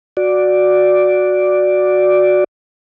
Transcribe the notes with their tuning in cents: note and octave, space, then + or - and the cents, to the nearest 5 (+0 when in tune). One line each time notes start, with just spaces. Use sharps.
F#4 -10 D5 +0